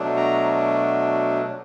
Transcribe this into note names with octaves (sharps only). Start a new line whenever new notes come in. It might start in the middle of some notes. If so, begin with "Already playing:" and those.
Already playing: B2 F#3 A3 D4
A#5